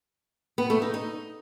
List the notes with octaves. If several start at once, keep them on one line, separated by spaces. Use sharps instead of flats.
B3
A3
D#4
D#4